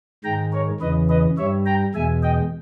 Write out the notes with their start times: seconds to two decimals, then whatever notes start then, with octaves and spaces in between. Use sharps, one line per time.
0.24 G#2 D#3 G#3 G5 A#5
0.52 A#4 C#5
0.80 E2 C#3 E3 B4 D#5
1.09 B4 D#5
1.38 G2 G3 C#5 E5
1.66 G5 A#5
1.95 E2 B2 G#3 E5 G#5
2.23 D#5 G5